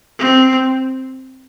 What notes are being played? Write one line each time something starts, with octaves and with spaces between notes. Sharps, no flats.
C4